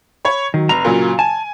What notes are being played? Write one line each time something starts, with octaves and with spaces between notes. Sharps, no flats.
C#5 B5
D#3 F#3
F1 A#5 F7
A#2 C#3 F#3
G#5 A5